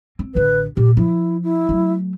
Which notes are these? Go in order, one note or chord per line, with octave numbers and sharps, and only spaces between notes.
C4
A1 D3 B4
A#2 G4
F3 E4
E4
F#3 A3